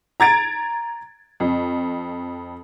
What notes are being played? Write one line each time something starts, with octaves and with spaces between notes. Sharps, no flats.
A#5 G#6 A6 D7
F2